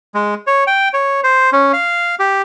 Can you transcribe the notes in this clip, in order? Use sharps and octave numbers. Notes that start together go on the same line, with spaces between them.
G#3
C#5
G5
C#5
C5
C#4
F5
G4